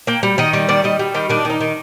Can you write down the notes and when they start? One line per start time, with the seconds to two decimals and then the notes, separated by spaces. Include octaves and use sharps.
0.07 A#3 G5
0.23 G3
0.38 D#3 D#5
0.53 G3
0.69 D#3 D5
0.84 G3 D#5
0.99 G3
1.15 D#3 G4
1.30 D#3 D4
1.45 D#3 D#4
1.60 D#3